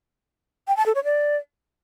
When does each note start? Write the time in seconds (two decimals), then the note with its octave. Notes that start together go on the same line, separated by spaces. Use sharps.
0.68 G5
0.77 A5
0.86 A4
0.95 C#5
1.04 D5